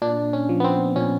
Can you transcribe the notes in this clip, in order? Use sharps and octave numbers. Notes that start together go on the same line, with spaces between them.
A#2 D4
C#4
F3
B3
C4
A#2 C#4